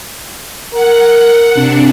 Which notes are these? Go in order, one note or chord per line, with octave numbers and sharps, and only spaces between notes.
A#4 F#5
C3 D4